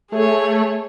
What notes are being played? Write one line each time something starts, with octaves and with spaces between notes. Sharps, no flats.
A3 G#4 C#5